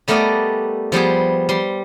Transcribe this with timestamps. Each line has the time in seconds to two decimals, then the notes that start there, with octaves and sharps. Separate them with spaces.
0.08 G3 A3 B3 A#4 D5 D#5
0.92 F3 G3 B3 G#4
1.49 G3 C6